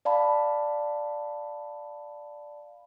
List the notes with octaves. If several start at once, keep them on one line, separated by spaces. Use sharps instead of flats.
D5 F5 A5 B5